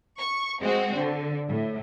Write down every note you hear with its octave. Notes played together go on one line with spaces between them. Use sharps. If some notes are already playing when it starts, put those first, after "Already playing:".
C#6
G#3 C4 F#4
D3
A2